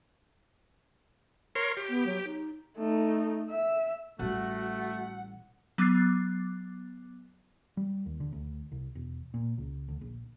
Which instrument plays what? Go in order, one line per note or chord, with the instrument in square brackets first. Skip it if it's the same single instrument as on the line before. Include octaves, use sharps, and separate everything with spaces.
[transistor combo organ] A#4 C#5 C6
G4
[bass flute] B3
F#3
D#4
[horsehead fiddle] A3 D#4
E5
[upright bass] A1 G3 [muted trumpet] A3 [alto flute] F#4 [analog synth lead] F#5
[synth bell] F#3 B3 D6 F#6 A6 C7
[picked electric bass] G3
D#2
D3
D2
C2
E1
A#2
C#2
D2
A#1